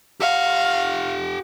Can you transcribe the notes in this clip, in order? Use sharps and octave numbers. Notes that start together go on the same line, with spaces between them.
G4 F5 F#5